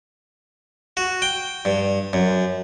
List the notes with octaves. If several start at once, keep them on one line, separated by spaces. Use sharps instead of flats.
F#4
G5
G2
F#2